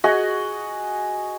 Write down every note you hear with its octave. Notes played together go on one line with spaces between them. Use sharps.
F#4 G#4 D#5 F#5